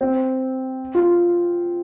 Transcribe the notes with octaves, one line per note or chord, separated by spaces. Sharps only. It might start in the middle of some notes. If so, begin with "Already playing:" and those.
C4
F4